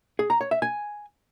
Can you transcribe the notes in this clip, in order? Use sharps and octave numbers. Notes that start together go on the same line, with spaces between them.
G#4
A#5
C#5
E5
G#5